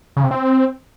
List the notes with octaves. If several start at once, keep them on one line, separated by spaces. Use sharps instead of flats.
C#3
C3
C4